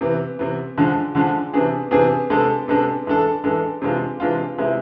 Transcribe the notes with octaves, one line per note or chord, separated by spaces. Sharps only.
C3 E3 B3
C3 E3 B3
D3 F3 G#3 D4
D3 F3 G#3 D4
C3 E3 B3 D4 G#4
C3 E3 B3 D4 G#4
C3 G#3 B3 D4 A4
C3 G#3 B3 D4 A4
E3 G#3 D4 A4
E3 G#3 D4 A4
C3 E3 G#3 D4 F4
C3 E3 G#3 D4 F4
C3 G#3 B3 E4